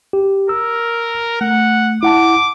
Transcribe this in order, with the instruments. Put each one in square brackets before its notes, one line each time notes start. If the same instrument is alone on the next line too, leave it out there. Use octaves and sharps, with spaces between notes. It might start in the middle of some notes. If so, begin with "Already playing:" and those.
[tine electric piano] G4
[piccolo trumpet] A#4 [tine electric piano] E6
[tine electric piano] A3 [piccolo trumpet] F#5
[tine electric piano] E4 F#5 A5 [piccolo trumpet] D6